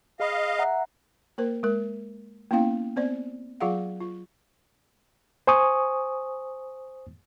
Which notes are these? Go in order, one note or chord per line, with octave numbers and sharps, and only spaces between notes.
G#4 D#5 F5 B5
E5 F#5 A#5
A#3 A#4 C5
G#3 A#4
A#3 B3 C#4 E4 F5 G5
B3 C4 C5 D5
F#3 F4 G#4 F5 F#5
F4
C5 G#5 C#6 D#6